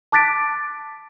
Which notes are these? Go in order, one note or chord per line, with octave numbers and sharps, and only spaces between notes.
A5 D6 F#6 A6 B6 D7